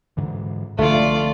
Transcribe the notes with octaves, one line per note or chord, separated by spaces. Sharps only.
G#2 D3 E3
C2 D3 F3 A3 F4 D5